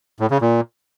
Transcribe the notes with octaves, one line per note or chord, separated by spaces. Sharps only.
A2
C#3
A#2